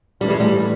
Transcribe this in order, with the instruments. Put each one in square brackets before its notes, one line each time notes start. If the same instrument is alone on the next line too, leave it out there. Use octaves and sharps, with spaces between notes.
[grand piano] A2 E3 A3 C#4 [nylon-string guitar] G3
[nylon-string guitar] G#3
G3